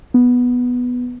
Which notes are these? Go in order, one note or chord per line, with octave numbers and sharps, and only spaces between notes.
B3